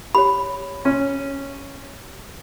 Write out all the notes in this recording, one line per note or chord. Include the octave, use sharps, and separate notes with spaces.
G4 C#5 B5
C#4